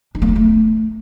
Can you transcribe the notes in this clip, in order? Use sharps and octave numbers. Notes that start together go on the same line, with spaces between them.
D4
A#3
B3
A3